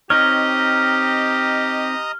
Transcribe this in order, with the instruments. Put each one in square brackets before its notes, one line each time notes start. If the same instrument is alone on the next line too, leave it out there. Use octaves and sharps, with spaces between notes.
[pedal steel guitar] C4 D#4 C#5 [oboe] G4 [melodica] D#5 A#5 D#6 [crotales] F6